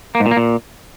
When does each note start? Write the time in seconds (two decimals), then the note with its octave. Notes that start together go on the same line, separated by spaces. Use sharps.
0.15 A#3
0.20 G#2
0.26 A#2
0.31 A#3
0.37 A#2